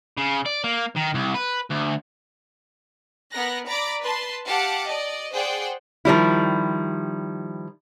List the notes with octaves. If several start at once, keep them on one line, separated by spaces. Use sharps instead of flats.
C#3
D5
A#3
D#3
C2
B4
D2
B3 A#4 F#6 A#6
D5 A#5 B5 D6
B4 A5 C6
G4 F5 F#5 A5 D6
D5 D#5
G#4 C5 D5 F#5 G5
D#3 F3 G3 E4